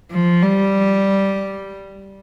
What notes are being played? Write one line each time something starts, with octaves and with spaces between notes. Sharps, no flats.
F3
G3